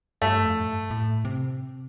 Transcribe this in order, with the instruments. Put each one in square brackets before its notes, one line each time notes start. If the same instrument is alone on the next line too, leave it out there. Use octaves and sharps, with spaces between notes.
[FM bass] G2 [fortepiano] A3
[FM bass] F2
A2
G2
A2
C3